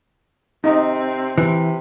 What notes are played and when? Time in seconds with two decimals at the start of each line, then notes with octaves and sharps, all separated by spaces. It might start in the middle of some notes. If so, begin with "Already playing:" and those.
0.64 C3 C4 D#4
1.38 C3 E3